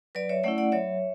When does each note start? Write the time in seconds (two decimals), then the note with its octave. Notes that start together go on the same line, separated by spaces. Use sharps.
0.15 F#3 B4 D5
0.29 C#5 E5
0.44 A3 C#4 E4 D5 F#5
0.58 D5 F#5
0.72 F#3 C#5 E5